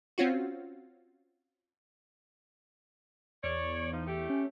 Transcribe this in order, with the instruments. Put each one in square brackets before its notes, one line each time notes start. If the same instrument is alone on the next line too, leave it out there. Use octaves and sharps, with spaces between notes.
[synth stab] C4 C#4 F4 F#4
[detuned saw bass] E2 [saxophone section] C#5 D5
[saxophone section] F3 D#4
A3 G4
[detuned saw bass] C#4